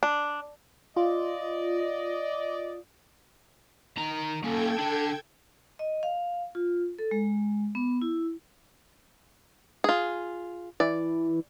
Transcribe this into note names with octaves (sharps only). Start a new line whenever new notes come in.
D4
F4 D5 D#5
D#3 A#5
A#3 C#4 A4 G5 G#6
D3 D4
D#5
F5
F4
A4
G#3
B3
E4
F4 G#4
E3 D5